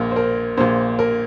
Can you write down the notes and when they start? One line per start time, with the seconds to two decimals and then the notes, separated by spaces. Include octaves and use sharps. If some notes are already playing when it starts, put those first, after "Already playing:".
Already playing: A#1 A#2 A#4
0.11 C5
0.16 A#4
0.57 A#1 A#2 C5
0.99 A#4